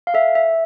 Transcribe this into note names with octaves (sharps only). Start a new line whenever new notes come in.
F5
A4 E5
E5